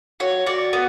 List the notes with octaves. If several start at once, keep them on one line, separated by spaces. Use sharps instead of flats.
F#4 C#5
F#4 D5
B3